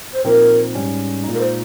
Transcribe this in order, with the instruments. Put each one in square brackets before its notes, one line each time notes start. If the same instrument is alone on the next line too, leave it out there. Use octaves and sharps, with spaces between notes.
[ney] C5
[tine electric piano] A#2 F3 C4 D#4 [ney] A#4
[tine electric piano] G#2 G3 C#4
A#2 G#3 D#4
[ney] A#4
C5